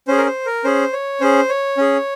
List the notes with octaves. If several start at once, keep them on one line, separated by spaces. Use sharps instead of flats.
C#4 G#4 C5
A#4
C5
A#4
C#4 G#4 C5
C#5
C#4 G#4 C5
C#5
C#4 G#4